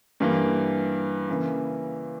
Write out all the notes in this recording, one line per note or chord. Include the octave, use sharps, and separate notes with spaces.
G2 E3 A#3
C#3 E3 A#3